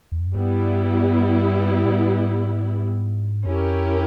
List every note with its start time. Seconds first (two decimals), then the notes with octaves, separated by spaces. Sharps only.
0.12 E2
0.20 F2
0.27 F#2
0.35 G2 G3 B3 E4
1.85 A2
1.90 G#2
3.46 F2 C#4 E4 G4 A#4